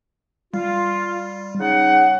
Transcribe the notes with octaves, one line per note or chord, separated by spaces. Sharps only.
G3 F4
C#3 D#4 F#5